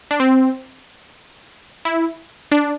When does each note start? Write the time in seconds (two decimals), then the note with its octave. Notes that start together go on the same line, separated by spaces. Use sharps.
0.11 D4
0.20 C4
1.85 E4
2.52 D4